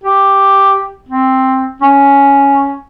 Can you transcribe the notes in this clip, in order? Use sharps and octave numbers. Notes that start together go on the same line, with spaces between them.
G4
C4
C#4